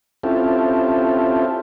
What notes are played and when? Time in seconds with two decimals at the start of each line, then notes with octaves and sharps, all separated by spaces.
0.23 C4 C#4 E4 F4 G4 A4